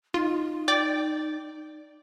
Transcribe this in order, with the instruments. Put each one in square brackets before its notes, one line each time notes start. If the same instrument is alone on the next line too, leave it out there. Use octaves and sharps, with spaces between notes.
[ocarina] D#4 [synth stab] F4
[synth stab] D5 G5 D6